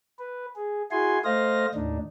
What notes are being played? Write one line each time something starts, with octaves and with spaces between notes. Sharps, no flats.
B4
G#4
E4 F#4 G#4 G#5 C6
A3 C5 D#5 F5 A#6
D#2 A2 D4 D#4